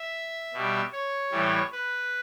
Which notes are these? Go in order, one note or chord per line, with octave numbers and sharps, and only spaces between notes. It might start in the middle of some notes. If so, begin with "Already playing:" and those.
Already playing: E5
B2 G3
C#5
A2 E3 G3
B4